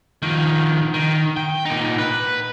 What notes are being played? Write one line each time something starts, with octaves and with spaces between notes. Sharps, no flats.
D#3 F3
D#3
G5
A#2 D#4
B4